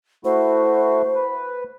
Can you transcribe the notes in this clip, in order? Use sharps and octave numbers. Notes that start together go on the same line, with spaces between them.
A3 E4 F#4 C5
B4